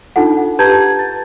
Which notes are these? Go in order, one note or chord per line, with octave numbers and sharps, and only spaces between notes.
D4 D#4 F4 A4 F#5
G4 B4 A5 A#5 G6 G#6
A6